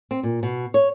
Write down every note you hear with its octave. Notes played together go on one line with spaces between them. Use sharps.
C4
A#2
B2
C#5